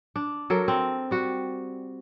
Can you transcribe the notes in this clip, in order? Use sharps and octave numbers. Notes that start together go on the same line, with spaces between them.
D4
F#3 A4 A#4
C4
G3 F#4